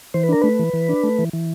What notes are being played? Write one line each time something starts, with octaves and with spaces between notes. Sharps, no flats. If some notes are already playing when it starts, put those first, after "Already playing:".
E3 C5
B4
D4 A#4
A3 B4
E3
E3
D4
A3
E3
E3